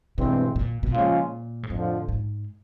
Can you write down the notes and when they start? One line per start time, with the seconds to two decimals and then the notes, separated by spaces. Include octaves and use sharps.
0.18 G2 B2 E3 G#3 C4
0.56 A#2
0.83 B2
0.93 A#2 C#3 F3 G#3 C#4 F4
1.63 G#2
1.70 F2 A2 D3 F3
2.09 G#2